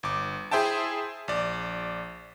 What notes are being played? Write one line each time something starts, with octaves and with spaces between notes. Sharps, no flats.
G1 D6
E4 G#4 C5 E5 G5 A5
A#1 D5